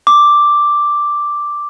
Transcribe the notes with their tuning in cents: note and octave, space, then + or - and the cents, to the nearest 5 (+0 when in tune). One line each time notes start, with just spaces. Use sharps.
D6 +0